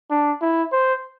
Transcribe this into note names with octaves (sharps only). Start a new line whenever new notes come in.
D4
E4
C5